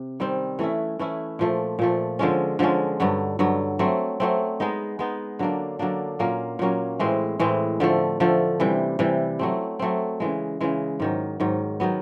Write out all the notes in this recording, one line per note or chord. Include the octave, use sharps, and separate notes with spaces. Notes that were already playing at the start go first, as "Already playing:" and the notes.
Already playing: C3
D#3 G3 C4
E3 A3 C#4 E4
E3 A3 C#4 E4
A#2 F3 A3
A#2 F3 A3
D3 F3 G#3 C#4
D3 F3 G#3 C#4
G2 D3 F#3
G2 D3 F#3
F#3 A3 C4
F#3 A3 C4
G#3 B3 D#4
G#3 B3 D#4
D3 F#3 A#3 D4
D3 F#3 A#3 D4
A#2 F#3 A#3 C#4
A#2 F#3 A#3 C#4
A2 E3 G#3 C4
A2 E3 G#3 C4
D3 F3 A3
D3 F3 A3
C3 E3 G3
C3 E3 G3
F#3 A3 C4
F#3 A3 C4
C#3 E3 G#3
C#3 E3 G#3
G#2 D#3 F#3
G#2 D#3 F#3
D#3 F#3 B3